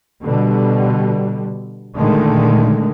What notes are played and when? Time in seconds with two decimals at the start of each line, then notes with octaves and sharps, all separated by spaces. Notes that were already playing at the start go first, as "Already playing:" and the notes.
0.23 B2 D3 G3
1.95 A#2 D3 D#3 G#3 A3